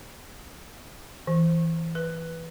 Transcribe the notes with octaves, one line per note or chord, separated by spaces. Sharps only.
E3
B4